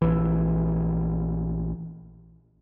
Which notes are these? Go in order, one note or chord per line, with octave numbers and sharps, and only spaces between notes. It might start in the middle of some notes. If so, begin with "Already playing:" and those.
A#1 E3